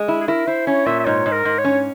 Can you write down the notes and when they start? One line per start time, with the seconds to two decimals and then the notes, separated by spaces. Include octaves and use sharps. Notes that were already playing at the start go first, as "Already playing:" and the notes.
Already playing: G#3
0.08 E4
0.21 G#4
0.28 E4 A#4
0.47 E4 C5
0.67 C#4 C#5
0.86 A#2 E5
1.00 E5
1.06 G#2 C#5
1.26 G#2
1.32 A#4
1.45 G#2
1.58 C#5
1.64 C#4